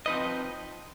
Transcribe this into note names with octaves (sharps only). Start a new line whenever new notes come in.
F3 C4 D#4 B4 D#5